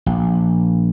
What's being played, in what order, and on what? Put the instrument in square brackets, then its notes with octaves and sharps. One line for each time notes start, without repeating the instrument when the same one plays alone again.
[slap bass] A#1